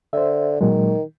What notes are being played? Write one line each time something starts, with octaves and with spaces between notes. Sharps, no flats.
D3 C5 E5
A#2 D#3 F#3 G#3